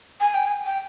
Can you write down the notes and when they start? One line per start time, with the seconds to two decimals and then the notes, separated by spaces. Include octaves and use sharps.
0.20 G#5
0.34 G5
0.47 G#5
0.65 G5